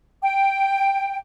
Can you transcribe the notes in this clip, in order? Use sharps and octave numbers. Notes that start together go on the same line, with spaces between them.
G5